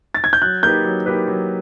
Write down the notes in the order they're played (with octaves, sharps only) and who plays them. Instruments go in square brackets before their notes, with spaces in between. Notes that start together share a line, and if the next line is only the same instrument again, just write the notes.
[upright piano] A6
G#6
G6
[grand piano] F#3 [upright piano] F#6
[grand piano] A#3 D#4 G4 B4 [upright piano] G6
[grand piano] F#3
A#3 D#4 G4 B4
F#3